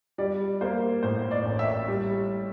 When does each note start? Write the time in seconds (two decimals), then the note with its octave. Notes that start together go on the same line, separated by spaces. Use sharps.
0.18 G3 D5
0.61 A#3 C5
1.03 A2 C5
1.31 D5
1.45 A1
1.59 E5
1.88 G3